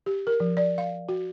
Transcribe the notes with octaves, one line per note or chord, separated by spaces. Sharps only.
G4
A#4
F3
D5
F5
F#4